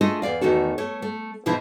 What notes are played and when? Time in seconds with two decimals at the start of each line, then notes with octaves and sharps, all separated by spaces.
0.01 A3 D4 F4 G#4 A4 D#5
0.22 E2 C3 D5 F5
0.41 E2 D#3 A3 F#4 A4
0.78 A3 C#5
1.02 A3
1.46 B2 E3 F3 D#4 E4